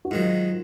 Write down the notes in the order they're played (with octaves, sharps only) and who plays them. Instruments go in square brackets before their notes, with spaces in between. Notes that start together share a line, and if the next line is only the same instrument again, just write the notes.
[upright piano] F#4
[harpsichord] G#2 D#3 F#3 [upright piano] F4